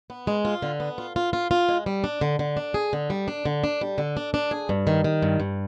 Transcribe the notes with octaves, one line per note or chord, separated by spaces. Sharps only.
B3
G#3
F4
D3
B3
F4
F4
F4
F4
G#3
G3
D4
D3
D3
D4
G#4
D3
G3
D4
D3
D4
G3
D3
D4
D4
G#4
G2
D#3
D#3
G2
G2